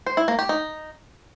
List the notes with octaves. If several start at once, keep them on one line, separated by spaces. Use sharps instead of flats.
C5
E4
A#3
G4
D#4